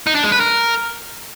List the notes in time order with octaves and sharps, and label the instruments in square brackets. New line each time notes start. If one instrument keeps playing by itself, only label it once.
[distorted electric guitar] D#4
D4
G#3
B4
A#4